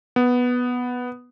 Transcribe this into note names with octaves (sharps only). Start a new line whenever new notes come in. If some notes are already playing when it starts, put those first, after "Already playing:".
B3